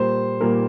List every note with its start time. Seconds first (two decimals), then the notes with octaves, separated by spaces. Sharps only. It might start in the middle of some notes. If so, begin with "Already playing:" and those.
Already playing: A#2 G3 A#3 C5
0.40 A#2 G3 A#3 A#4